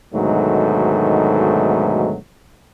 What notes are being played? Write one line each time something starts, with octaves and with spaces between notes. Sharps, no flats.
D2 G#2 B2 D#3 F#3 A3